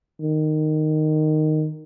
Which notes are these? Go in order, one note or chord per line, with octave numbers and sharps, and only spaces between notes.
D#3